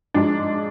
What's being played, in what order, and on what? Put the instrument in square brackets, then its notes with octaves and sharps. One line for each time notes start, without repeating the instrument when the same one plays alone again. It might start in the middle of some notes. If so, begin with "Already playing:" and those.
[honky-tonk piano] G#2 F3 G#3 D4